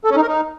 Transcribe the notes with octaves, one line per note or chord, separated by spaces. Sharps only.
A4
C#4
D#4
A#4
D#4